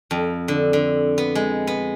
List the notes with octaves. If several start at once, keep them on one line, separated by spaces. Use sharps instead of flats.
F2
D3
D3
B3
G#3
B3